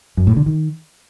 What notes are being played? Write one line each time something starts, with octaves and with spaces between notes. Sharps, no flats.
F#2
A2
D3
D#3